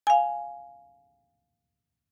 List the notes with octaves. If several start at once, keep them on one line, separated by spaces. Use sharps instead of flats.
F5 G#5